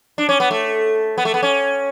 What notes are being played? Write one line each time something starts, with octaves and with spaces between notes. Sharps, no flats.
D4
C#4
B3
A3
B3
A3
B3
C#4